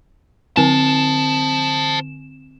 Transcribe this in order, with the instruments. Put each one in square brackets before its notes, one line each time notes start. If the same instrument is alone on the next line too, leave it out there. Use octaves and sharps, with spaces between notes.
[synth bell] D3 C4 E7 [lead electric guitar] C5 A5